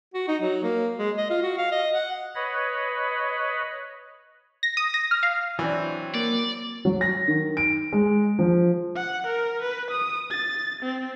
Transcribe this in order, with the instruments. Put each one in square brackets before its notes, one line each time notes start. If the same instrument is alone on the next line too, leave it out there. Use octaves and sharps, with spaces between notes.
[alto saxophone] F#4
D#4
F#3
A#3
G#3
D#5
F4
F#4
F5
D#5
F#5
[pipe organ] B4 C#5 D#5 B5
[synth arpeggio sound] A#6
D#6
A#6
F6
F5
[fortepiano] E3 D4 [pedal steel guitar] F#3 C4
[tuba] A#3 [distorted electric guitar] D5
[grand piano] F#3
A#6
D#3
D7
G#3
F3
[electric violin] F#5
A#4
B4
D#6
A6
C4